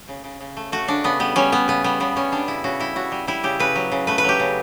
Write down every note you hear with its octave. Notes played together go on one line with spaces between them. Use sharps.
C#3
C#3
C#3
A3
A3 F#4
C#3 D4
C#3 B3
G3 B3
G3 C#4
G3 B3
C#3 B3
G3 B3
C#3 B3
G3 C#4
G3 D4
C#3 E4
C#3 F#4
G3 E4
C#3 F#4
G3
G3 E4
C#3 G4
C#3 B4
F#3
C#3
A3 B4
B4
F#3 G4
C#3